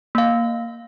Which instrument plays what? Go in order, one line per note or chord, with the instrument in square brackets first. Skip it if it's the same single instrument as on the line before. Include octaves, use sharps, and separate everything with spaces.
[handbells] A#3 F5